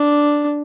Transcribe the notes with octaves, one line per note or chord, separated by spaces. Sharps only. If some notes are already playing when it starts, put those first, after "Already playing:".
Already playing: D4